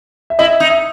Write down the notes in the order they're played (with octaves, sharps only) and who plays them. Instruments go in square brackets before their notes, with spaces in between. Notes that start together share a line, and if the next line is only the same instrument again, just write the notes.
[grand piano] E5
[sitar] E4 [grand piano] D#5
[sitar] D#4
[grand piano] E5